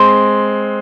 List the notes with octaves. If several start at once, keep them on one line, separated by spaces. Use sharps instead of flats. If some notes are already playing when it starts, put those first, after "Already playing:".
Already playing: G#3 C4 C6